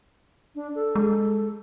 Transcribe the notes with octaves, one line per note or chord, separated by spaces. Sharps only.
D4
A4
G#3